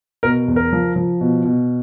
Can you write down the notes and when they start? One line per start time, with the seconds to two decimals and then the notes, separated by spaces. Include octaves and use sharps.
0.23 B2 A#4
0.48 E2
0.56 A#4
0.72 F3
0.96 F3
1.21 B2
1.45 B2